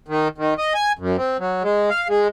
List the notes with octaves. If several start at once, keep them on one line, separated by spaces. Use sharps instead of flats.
D#3
D#3
D#5
G#5
F#2
C4
F#3
G#3
F5
G#3